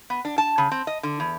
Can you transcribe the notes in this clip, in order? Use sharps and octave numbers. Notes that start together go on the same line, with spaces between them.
B3
D4
A5
C#3
C4
D#5
D3
E2